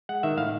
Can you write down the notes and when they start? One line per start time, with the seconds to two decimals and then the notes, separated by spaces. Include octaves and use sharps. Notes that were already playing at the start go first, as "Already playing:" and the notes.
0.09 G#3 F#5
0.23 D#3 E5
0.38 A2 F5